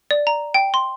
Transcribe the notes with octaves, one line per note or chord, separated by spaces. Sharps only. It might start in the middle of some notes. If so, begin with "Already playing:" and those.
D5
A#5
G5
C6